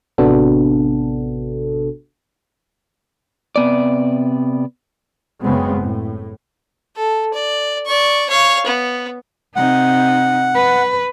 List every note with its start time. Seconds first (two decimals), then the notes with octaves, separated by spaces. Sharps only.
0.18 A1 C3 B3 D4 F#4 A4
3.56 C3 B3 D5
5.42 F#1 C#3 G#3 B3 C4
5.81 A2
6.95 A4
7.34 D5
7.86 D5 C#6
8.29 C#5 F5
8.66 B3
9.56 C3 D#4 F#5
10.55 B4